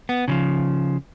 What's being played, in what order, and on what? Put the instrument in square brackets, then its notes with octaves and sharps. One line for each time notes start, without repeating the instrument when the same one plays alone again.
[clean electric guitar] B3
C#3 E3 F3